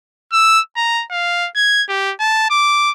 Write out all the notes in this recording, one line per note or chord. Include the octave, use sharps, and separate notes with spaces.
E6
A#5
F5
G#6
G4
A5
D6